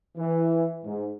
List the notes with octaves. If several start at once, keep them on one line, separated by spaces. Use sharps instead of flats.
E3
G#2